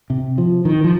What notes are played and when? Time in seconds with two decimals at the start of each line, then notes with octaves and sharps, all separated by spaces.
0.10 C3
0.38 F3
0.65 D#3
0.84 F3